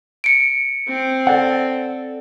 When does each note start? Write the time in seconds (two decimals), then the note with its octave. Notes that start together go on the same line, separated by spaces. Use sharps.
0.24 C#7 D7
0.88 C4
1.27 A4 D5 F#5